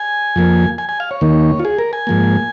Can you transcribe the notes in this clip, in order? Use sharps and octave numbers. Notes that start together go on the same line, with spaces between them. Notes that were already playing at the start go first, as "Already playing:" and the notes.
Already playing: G#5
F2 F3 A#3
G#5
G#5
F5
C#5
D#2 D#3 A#3
F4
G#4
A#4
G#5
G#2 F3 A#3